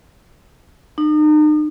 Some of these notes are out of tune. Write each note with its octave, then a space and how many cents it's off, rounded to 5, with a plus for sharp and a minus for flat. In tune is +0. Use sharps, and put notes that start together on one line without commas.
D#4 -40